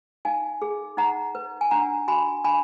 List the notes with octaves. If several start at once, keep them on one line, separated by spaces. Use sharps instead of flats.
D#4 F5 G#5
G#4
D#4 F#5 A#5
B4
G#5
D4 F#5 A#5
F#4 G#5 B5
D4 G#5 B5